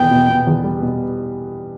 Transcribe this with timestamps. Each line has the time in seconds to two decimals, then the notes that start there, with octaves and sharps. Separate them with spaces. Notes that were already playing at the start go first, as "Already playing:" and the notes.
Already playing: E2 B2 B3 G5
0.11 B2
0.29 B2
0.47 E2
0.64 G3
0.82 B2